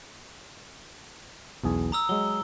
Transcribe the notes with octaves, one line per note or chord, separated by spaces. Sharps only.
B1 E2 G#4
A#5 D#6 E6
F#3 G#3 G7